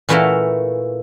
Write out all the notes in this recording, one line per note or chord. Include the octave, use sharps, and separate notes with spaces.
A#2 E3 A3 E4 F#4 F5